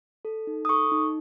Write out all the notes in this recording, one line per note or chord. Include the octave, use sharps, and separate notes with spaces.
A4
D#4
D#6
A4 C#6
D#4